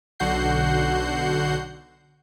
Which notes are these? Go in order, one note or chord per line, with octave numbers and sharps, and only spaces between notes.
B1 D3 F#4 F#5 G6 C7